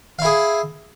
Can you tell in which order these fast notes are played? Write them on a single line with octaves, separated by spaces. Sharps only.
F5 E4 G#4